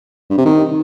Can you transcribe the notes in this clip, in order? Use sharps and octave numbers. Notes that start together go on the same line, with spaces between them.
G2
C3
D#3